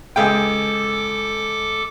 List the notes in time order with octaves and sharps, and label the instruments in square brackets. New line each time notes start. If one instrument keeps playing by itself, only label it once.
[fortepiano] C#2 G#4 G5 [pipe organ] A4 D6